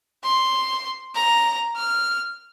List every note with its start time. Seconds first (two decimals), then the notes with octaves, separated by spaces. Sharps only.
0.23 C6
1.15 A#5
1.75 F6